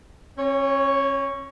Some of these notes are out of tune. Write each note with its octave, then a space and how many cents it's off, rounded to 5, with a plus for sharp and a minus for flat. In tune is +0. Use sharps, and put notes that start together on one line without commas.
C#4 -35 C#5 +0